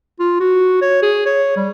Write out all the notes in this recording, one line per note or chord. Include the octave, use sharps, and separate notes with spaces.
F4
F#4
C#5
G#4
C#5
G3